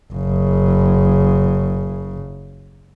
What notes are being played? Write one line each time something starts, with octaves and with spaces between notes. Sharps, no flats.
F#1 C#3